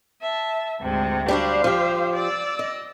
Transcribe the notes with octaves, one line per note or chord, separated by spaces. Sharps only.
E5 A5
D2 G#2 C3
G3 D4 F#4 C5 F5
F3 G4
D5 E6
D#5